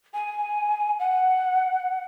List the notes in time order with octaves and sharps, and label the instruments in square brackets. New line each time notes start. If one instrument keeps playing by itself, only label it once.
[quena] G#5
F#5